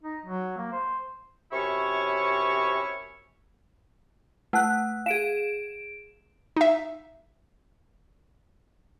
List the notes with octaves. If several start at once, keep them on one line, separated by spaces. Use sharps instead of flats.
D#4
F#3
A#3
C5
F#2 C3 C#4 E4 C#5 C#6
A3 B4 F#5 A5 F#6
G#4 F5 D7 E7
D#4 E5